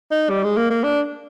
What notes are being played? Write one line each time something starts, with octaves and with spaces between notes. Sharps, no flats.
D#4
G3
G#3
A#3
A#3
D4